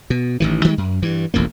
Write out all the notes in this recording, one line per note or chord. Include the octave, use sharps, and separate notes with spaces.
B2
A1 D#3 E3
D#3 E3 G3 G#3
F#2
G2 E3
E1 A1 F2 A#3